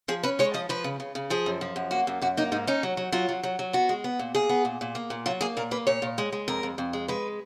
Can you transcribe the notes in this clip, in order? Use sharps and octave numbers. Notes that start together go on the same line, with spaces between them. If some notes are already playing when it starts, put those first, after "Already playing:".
F3 G#4
C#4 B4
G#3 C#5
F3 D#5
F3 B4
C#3
C#3
C#3
F3 G#4
F#2
F3
F#2
A#3 F#4
F#2
F#2 F#4
A#3 D#4
G#2 D#4
C#4 D#4
F#3
F#3
F#3 F4
F#3
F#3
F#3
B3 F#4
G#3
B3
A#2
A#2 G#4
B3
A#2
A#2
A#3
A#2
F#3 F4
A#3 G#4
A#2 A#4
A#3 B4
A#2 C#5
A#2
G#3
G#3
F2 A#4
F2
F2
G#3
G#3 B4